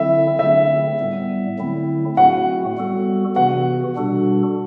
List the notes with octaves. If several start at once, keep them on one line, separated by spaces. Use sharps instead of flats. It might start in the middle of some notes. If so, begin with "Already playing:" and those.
Already playing: D3 F#3 C4 E4 A4 E5
D3 F#3 A3 C4 E5
A2 G3 B3
D3 F#3 A3 C4 E4
A2 F#3 A3 C4 F#4 F#5
G3 B3 F#4 A4
C3 E3 B3 F#4 F#5
B2 G3 D4 F#4 A4